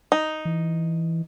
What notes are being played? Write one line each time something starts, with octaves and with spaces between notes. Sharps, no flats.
D#4
E3